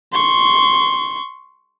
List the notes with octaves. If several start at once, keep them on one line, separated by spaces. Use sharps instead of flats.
C6 C#6